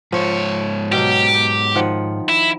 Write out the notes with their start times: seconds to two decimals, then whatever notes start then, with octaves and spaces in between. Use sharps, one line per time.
0.12 G#2 F3 C#5
0.92 B2 F#3 G4
1.75 D#3 F3 F#5
2.29 E4